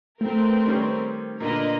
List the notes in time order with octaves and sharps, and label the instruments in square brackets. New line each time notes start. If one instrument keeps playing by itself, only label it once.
[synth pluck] A3 [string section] C4 A#4 B4
[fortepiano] D#3 G3 C#4
[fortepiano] A#2 D3 A#3 [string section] A#4 B4 D#5